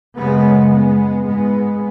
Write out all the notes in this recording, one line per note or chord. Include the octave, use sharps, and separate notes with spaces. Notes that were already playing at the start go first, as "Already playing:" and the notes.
F#2 C#3 G#3 B3
G#3 B3
G#2 G#3 B3